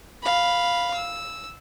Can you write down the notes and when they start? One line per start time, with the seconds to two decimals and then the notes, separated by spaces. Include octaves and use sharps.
0.23 F5 B5
0.94 E6